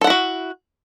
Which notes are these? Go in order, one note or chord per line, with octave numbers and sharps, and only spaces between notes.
E4 F#4 A4 F#5